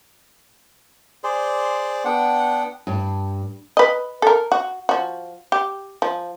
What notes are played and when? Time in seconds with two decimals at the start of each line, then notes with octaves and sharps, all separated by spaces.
1.24 G#4 C5 D5 C6
2.05 B3 D4 F#5 G5
2.87 G2
3.77 B4 D#5
4.22 A4 A#4
4.52 F#4
4.89 F3 F#4
5.52 G4
6.02 F3